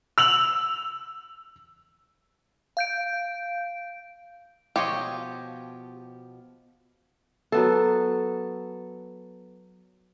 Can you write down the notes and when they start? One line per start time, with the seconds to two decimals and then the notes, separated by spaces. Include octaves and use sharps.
0.18 E6 F7 F#7
2.77 F5 G6 D7
4.76 B2 F3 F4 G4 C#5 D#5
7.52 F#3 B3 A4